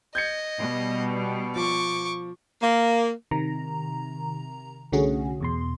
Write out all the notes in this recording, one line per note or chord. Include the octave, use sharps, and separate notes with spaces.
D#5 G6 G#6 C#7
B2 G3
F3 C#6 D6
A#3
C3 D#3 A#5
C2 D3 A3 C#4 F#4 G#4
E2 B2 C6